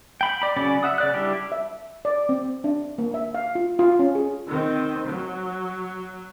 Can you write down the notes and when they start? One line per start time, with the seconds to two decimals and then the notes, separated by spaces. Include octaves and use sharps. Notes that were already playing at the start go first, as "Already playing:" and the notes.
0.21 G5 B5
0.42 D5 B5
0.56 C#3 F#3 C#4 D5 B5
0.83 E5 F#5 D#6
0.98 C#3 D5 F#6
1.14 G3 D4 E4 G4
1.52 E5
2.05 D5
2.29 C4
2.64 D4
2.98 A#3
3.14 E5
3.35 F5
3.55 F4
3.79 F4
3.99 C#4
4.15 G#4
4.47 D#3 C4
5.06 F#3